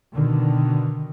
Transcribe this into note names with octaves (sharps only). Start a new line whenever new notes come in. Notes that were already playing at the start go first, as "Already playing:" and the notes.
B2 D3 D#3